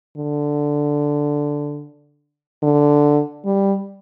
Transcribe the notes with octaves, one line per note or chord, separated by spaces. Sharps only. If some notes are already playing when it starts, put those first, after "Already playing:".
D3
D3
G3